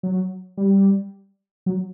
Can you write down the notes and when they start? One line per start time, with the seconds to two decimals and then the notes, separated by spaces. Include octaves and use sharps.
0.03 F#3
0.57 G3
1.66 F#3